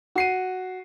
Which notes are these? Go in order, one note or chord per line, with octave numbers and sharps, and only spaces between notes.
F#4 C7 D#7